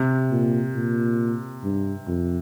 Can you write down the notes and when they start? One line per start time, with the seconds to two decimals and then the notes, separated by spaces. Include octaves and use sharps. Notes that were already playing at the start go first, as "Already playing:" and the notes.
Already playing: C3
0.31 A#2
0.75 A#2
1.64 G2
2.07 F2